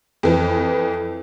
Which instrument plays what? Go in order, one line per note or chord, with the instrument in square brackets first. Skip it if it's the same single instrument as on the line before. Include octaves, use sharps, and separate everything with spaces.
[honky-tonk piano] F2 E3